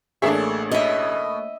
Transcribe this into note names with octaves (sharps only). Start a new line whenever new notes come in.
A1 A3 A#3 D4 G#4 C#5 E5
B2 D#5 E5